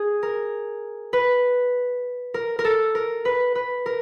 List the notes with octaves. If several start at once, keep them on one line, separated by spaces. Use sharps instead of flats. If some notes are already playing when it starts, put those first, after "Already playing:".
Already playing: G#4
A#4
B4
A#4
A#4
A4
A#4
B4
B4
A#4